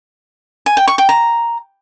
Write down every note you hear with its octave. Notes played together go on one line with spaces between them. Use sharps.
G#5
G5
C#6
G5
A#5